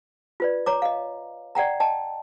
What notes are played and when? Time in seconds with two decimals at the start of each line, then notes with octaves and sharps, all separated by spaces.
0.40 F4 B4 D5
0.66 C#5 A#5 D6
0.82 D#5 F5
1.55 D5 F#5 G5 A#5
1.80 D#5 G5 A5